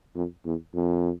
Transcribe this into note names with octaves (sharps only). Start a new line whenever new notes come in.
F2
E2
F2